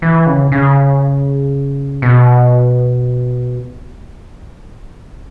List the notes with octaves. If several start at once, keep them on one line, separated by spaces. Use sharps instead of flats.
E3
C#3
C#3
B2